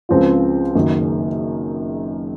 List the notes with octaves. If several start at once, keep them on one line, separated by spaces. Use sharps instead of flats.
C#2 C#3 F3 C4 F4
F#1 F#2 D#3